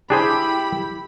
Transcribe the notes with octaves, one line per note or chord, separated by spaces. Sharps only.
D4 E4 G4 G#4 C5 B5